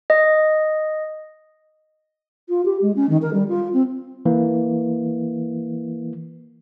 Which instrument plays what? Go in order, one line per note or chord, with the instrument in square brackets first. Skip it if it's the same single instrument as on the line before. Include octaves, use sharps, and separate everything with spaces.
[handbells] D#5
[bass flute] F4
G4
G#3
C#4
D#3
A#4
G3
F4
C4
[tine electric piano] E3 A#3